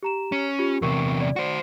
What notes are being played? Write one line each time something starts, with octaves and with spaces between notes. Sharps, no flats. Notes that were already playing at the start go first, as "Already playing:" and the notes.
G4 A#5 E7
C#4
F4 G4
E2 C3 A#4 C#6
D5
F#4 C5